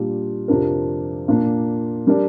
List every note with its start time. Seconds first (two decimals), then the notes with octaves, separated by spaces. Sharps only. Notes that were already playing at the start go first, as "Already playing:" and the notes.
Already playing: A#2 G3 D4
0.48 F2 C3 F3 D4 A#4
1.28 A#2 A#3 D4
2.07 G3 D4 A#4 D5